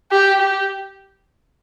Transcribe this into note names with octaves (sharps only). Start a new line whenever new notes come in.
G4
G4